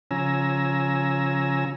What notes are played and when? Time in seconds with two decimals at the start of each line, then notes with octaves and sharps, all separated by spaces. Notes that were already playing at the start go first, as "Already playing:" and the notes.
0.11 C#3 F3 C#4 G#5 A#5 E6